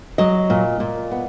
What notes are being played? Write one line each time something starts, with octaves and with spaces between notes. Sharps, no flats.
F#3 D#5
A#2
A#2
B3